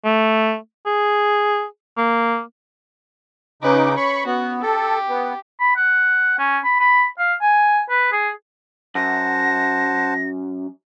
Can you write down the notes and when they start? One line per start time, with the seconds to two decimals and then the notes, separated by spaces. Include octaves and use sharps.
0.05 A3
0.86 G#4
1.97 A#3
3.62 C#3 C#4 D#4 B4 D6
3.97 C#5 B5 C#6
4.26 B3 F#4
4.62 G4 A4
5.09 B3
5.60 B5
5.76 F#5
6.39 C#4
6.64 B5
6.80 B5
7.18 F5
7.41 G#5
7.89 B4
8.12 G#4
8.95 F#2 C5 F#5 A5 A#6